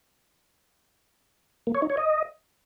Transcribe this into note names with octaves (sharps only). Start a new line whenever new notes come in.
A#3
C#5
D#4
C#5
D#5